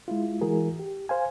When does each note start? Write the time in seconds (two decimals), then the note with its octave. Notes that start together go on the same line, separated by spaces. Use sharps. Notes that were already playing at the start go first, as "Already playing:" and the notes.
0.08 G#3 E4 F4
0.41 E3 G#3 E4 F#4 G#4 A#4
0.80 G4
1.09 C5 F5 G#5